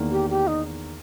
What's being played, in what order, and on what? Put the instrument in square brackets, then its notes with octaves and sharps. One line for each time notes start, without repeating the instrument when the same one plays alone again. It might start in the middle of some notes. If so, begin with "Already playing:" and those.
Already playing: [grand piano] E2 D#3 A#3
[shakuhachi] G4
G4
D#4